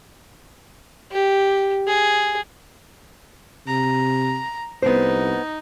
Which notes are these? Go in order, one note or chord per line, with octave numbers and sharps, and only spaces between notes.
G4
G#4
C3 A#5
C2 B3 D#4 C5